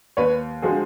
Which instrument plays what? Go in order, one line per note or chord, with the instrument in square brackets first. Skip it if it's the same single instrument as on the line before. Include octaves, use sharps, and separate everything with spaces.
[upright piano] D#2 B4 C#5
D3 F3 G#3 C4 F#4 G#4